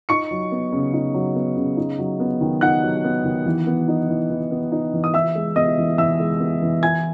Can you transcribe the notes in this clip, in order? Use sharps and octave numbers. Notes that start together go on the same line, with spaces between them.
D#4 C#6 C#7
F#3
B3
C#3
D#4
F#3
B3
C#3
D#4
F#3
B3
D#3
D#4 F#5 F#6
F#3
B3
D#3
E3
B3
D#4
E3
E3
B3
D#4
E3
D#6
E3 E5 E6
G#3
B3 D#5 D#6
E3
E3 E5 E6
G#3
B3
E3
E4 G#5 G#6